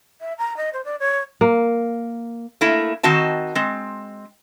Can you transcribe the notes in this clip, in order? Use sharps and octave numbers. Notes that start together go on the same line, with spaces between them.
E5
A#5
D#5
C5
D5
C#5
A#3
A3 A#3 E4
D#3 C4 F#4 D#5 A5
G#3 C4